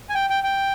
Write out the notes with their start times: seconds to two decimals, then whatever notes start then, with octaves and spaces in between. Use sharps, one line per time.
0.09 G#5
0.14 G5
0.30 G5
0.44 G5